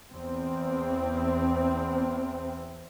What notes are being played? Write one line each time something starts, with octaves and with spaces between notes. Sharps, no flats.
E2 C4